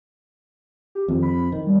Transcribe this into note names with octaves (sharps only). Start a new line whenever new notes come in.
G4
F2 D#3
B5
D#3
G3